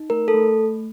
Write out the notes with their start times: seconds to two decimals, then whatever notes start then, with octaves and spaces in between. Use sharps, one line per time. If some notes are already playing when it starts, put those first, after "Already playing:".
Already playing: D#4
0.10 A3 A#4
0.28 A4
0.34 A3